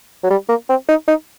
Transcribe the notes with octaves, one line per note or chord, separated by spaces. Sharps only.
F#3
G3
A#3
C4
D#4
D#4